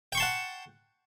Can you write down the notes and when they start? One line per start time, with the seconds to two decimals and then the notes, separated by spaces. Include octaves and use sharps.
0.12 G5
0.15 C#6
0.17 C6
0.20 A5
0.22 F#5